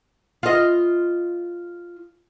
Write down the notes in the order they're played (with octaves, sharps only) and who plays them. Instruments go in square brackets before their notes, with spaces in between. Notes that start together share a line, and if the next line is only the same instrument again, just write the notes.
[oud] F4 D#5